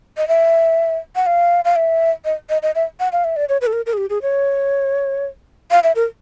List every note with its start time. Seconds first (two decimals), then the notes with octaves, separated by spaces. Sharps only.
0.17 D#5
0.28 E5
1.16 F#5
1.26 F5
1.65 F5
1.76 E5
2.25 D#5
2.50 D#5
2.63 D#5
2.75 E5
3.00 F#5
3.12 F5
3.24 E5
3.36 D5
3.49 C#5
3.61 B4
3.67 A4
3.73 A#4
3.86 A#4
3.93 G#4
3.97 G4
4.10 G#4
4.22 C#5
5.71 F5
5.83 E5
5.96 A#4